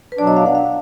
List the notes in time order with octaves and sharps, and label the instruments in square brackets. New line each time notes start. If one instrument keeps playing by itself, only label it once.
[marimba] B4
[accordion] B2 F#3 D4 [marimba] D5
[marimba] D#5
F5
F#5
F5